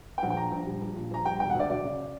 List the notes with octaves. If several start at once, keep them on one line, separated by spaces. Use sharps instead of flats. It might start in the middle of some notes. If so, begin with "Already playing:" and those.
G5
A#1 F#5
G5
A#2 A#5
A#1
G3
A#1
A#2
A#1 A#5
G3 G5
E1 G5
F#5
D2 D5
F#3 D5
C#3